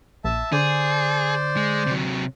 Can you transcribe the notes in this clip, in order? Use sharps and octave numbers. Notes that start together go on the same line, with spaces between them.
A#1 E5 A5
D3 G#4 C5 D5
G#3
C3 F#3